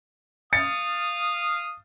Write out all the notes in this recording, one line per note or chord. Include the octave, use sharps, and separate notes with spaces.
F5 D#6 A6 C#7